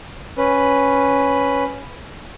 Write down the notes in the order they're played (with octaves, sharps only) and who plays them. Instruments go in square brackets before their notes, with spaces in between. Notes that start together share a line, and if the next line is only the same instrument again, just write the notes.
[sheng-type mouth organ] C#4 B4